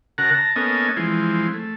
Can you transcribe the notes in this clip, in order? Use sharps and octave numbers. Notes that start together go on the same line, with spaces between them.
C#3 F#4 A#4 F#5 A5 A#5
A5 A#5
A#3 B3 C#4 A4 D#5 G#5
E3 F3 G#3 C4
A3